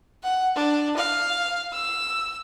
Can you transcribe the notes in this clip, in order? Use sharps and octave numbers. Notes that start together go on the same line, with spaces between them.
F#5
D4
F5
E6